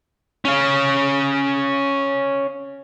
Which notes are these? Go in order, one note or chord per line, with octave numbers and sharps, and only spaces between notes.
C#4 F5